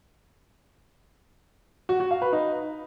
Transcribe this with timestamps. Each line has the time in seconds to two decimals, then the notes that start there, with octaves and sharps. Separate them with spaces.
1.89 F#4
2.00 F#4
2.11 F5
2.22 B4
2.33 D#4